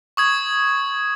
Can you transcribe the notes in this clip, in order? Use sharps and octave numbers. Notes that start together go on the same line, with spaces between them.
C#6 D#6 G#6